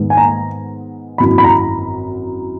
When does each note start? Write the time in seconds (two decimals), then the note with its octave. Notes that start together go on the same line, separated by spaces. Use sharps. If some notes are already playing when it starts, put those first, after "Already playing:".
Already playing: G#2 D#3 G#3 B3
0.10 G#5
0.17 A#5
1.18 G#1 F#2 E3 B5
1.38 B5
1.44 A#5